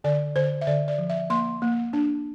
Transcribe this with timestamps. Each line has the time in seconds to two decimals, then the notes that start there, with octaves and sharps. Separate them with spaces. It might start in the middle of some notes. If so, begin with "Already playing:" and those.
0.04 D3 D5
0.36 D3 C5
0.61 E5
0.67 D3 D5
0.88 D5
0.98 F3
1.10 E5
1.30 A#3 C6
1.62 A#3
1.93 D4